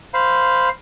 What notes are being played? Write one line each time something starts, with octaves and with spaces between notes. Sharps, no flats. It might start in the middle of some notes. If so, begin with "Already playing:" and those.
C5 F5 B5